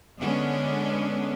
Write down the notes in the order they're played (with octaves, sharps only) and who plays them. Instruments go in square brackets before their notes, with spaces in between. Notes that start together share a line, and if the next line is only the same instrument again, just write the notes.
[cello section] D3 G#3 B3 C#4 D4